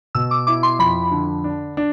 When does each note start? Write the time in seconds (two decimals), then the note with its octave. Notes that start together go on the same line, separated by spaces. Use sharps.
0.15 B2 E6
0.31 D6
0.47 E4 D6
0.63 C6
0.79 F2 B5
1.11 D3
1.44 D4
1.77 D4